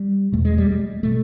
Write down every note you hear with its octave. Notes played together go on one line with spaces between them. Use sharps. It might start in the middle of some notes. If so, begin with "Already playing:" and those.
Already playing: G3
E2 B2 A3
G#3
G3
G#3
B2 A3